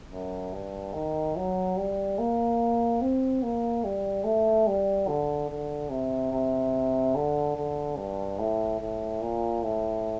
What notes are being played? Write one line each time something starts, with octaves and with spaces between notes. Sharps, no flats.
F#2
G2
D#3
F#3
G3
A#3
C4
A#3
G3
A3
G3
D3
D3
C3
C3
D3
D3
G2
A2
A2
A#2
A2